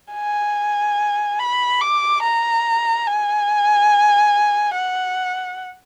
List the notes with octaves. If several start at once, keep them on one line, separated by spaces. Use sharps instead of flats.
G#5
B5
D6
A#5
G#5
F#5